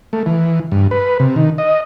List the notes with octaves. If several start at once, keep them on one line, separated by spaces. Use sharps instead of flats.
A3
E3
G2
B4
C3
D#3
D#5